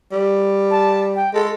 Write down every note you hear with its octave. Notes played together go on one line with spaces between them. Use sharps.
G3
A5
G5
G#3 A4